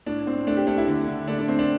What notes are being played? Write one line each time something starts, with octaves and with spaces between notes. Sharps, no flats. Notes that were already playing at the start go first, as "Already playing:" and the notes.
A2 D4
A2 C4
A3 D4
G4
A3 D4
E4
D3
D3
A3 D4
D4
A3 C4
D4